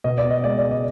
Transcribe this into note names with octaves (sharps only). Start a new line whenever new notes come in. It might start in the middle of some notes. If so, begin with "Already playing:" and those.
B2 D#5
D5
B3
D#5
G#3 D5
D5
G#3
D#5